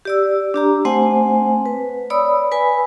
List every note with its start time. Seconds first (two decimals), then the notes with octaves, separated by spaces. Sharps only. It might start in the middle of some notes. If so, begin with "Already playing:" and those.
0.05 G4 D5 E6
0.54 D4 G4 A#5
0.85 A3 C4 C5 F#5 G#5
1.66 B4
2.10 C#5 D5 B5 D#6 E6
2.52 B4 G#5 B5